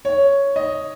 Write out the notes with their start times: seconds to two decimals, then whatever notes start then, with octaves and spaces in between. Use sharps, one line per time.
0.05 C#5
0.56 D#5